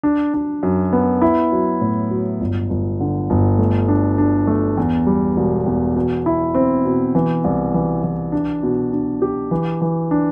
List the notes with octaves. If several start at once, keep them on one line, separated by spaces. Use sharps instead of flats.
D4
D4
F#2
B3
E4
F#3
A2
F#3
G1
G1
D3
G1
A3
D4
D4
A3
E2
G3
E1
E2
B2
E4
C4
B2
E3
C2
E3
E3
D4
B2
D4
G4
E3
E3
D4